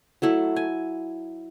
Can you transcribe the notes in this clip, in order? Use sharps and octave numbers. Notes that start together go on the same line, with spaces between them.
F#3 A3 E4
G#5